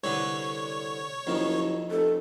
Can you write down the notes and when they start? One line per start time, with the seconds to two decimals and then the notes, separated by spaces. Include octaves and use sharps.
0.04 C2 D3 B4 C#5
1.27 F#1 F2 D#3
1.91 F1 A4